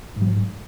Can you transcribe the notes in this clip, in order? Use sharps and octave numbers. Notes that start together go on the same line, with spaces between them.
G#2
F#3
G#2